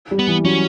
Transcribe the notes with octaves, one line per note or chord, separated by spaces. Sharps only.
G3
B3
E3
F#3 C#4